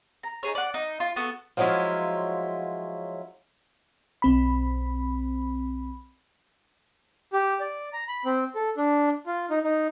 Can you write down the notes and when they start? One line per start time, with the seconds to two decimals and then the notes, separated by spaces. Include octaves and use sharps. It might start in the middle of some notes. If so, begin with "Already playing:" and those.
0.23 A#5
0.43 D#4 F#4 G#4 C#5
0.55 D5 F#5
0.74 D#4
1.00 F4
1.16 B3 F#4 A4
1.57 F3 F#3 G#3 C#4 E4 F4
4.22 B1 C4 B5
7.33 G4
7.60 D5
7.93 A#5
8.08 B5
8.25 C4
8.55 A4
8.77 D4
9.26 F4
9.50 D#4
9.64 D#4